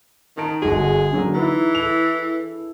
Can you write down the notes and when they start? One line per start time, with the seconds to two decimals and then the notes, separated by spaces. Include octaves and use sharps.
0.37 D#3 D#4 A5 D7
0.62 G1 G#3 D4 F#4 G#4
1.12 D3 F#3 A#3
1.34 E3 D#4 E4 B4
1.75 A4 F7